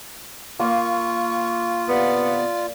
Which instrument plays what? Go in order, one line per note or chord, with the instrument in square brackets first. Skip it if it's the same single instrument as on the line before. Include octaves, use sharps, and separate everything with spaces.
[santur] A#3 A#5 C6 [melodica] F4 [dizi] C#6
[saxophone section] C3 B3 [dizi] D5